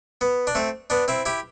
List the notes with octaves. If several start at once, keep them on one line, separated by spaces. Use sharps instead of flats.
B3
D4
A3 C4
B3 D4
C4 E4
E4 G4